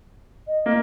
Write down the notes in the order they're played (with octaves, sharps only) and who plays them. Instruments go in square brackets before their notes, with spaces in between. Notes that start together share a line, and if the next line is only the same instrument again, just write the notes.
[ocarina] D#5
[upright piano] A#3